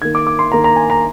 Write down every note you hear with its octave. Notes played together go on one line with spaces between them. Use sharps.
D#3 A#3 G#6
D6
D6
C6
D#3 A#3 A#5
A#5
G#5
A#5